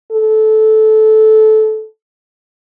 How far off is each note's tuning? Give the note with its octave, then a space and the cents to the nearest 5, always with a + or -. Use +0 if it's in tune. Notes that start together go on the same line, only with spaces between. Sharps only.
A4 -15